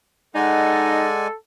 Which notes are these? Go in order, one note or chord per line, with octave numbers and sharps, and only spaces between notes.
G#3 D#4 A4 D5 F#5 G#5